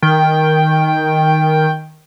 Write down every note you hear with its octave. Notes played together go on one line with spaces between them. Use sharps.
D#3 G5